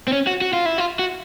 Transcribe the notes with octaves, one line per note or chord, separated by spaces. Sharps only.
C4
C#4
F#4
F#4
F4
E4
F4
F#4